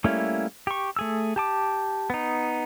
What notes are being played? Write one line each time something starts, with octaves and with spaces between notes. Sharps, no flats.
G3 A3 A#3 C#4 E4
G4 C#6
A3 G#4 E6
G4 A5 D6
B3 D#4